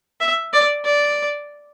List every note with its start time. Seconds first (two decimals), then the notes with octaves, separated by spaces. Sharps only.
0.21 E5
0.53 D5
0.85 D5